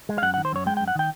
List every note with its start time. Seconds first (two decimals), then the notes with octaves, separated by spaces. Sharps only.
0.09 G#3
0.18 F5
0.22 F#2 F#5
0.34 D#3 F#5
0.45 C5
0.53 F#2 C#5
0.66 G#3 G5
0.77 F#2 G5
0.88 F#5
0.95 D#3 G5